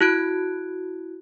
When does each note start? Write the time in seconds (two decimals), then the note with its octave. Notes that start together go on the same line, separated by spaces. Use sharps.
0.01 E4 F#4 F#6 G#6 D7